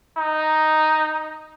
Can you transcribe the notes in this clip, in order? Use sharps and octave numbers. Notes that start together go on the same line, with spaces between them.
D#4